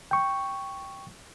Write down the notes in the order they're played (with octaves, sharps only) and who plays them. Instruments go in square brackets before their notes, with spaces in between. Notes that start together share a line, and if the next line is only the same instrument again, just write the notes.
[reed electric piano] G5 C#6